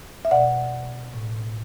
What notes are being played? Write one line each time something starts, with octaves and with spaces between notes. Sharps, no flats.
E5
B2 D5 F#5
A2